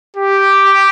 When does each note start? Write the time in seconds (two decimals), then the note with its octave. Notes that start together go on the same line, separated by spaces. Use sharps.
0.17 G4